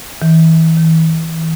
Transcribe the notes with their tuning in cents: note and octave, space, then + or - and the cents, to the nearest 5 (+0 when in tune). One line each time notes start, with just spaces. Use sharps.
E3 -30
E3 -45